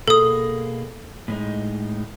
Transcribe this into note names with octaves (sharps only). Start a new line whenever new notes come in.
B2 A#3 G#4 A4 D#6
A2 G#3 D#4